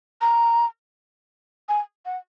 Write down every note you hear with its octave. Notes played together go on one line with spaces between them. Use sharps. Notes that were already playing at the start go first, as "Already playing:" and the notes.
A#5
G#5
F#5